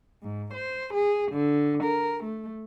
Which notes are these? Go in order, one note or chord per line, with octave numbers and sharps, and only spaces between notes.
G#2
C5
G#4
D3
A#4
A3